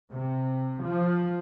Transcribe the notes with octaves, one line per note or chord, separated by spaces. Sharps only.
C3
F3